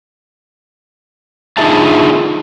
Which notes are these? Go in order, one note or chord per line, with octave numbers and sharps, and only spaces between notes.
D3 D#4 F4 G#4 E5 A5